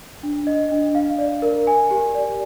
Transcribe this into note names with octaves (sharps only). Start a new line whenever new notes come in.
D4
D#5
D4
F5
D5
A#4
G#5
G4
D5